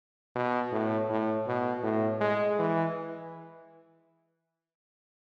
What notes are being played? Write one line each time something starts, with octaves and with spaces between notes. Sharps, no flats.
B2
A2
A2
B2
A2
G#3
E3